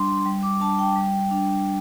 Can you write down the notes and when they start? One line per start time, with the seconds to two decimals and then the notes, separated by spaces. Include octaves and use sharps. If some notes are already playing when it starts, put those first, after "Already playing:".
Already playing: G3 D4 C6
0.26 G3
0.43 D6
0.61 D4 A5
0.79 G5
0.96 G3
1.31 D4